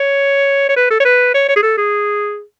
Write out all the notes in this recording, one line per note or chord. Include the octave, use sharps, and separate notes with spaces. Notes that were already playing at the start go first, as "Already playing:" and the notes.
Already playing: C#5
C#5
B4
A4
C#5
B4
C#5
C#5
G#4
A4
G#4